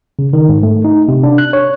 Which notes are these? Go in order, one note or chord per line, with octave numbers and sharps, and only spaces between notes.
C#3
D#3
G#2
A3
D#4
C3
D4
F#6
C#5